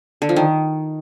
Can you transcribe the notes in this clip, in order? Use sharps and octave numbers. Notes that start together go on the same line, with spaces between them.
D3
F3
D#3